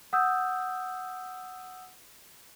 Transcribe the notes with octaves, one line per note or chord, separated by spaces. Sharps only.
F#5 D#6 E6 G6